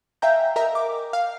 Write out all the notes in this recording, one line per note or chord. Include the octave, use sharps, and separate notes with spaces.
E5 F5 G5 G#5 A#5 G6
A#4 D#5 E5 A#5
D6
F5 F6